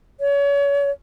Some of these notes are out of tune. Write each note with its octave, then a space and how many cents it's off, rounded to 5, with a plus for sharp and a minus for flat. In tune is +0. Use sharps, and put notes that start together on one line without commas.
C#5 +35